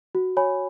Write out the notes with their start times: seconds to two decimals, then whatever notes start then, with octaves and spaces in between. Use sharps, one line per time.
0.15 F#4
0.37 C#5 G#5 B5